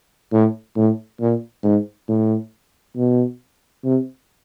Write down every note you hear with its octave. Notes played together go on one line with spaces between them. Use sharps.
A2
A2
A#2
G#2
A2
B2
C3